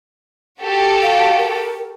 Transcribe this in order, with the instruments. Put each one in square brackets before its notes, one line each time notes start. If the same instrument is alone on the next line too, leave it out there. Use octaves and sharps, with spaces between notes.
[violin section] F#4 G4 A4
[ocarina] F5
A#4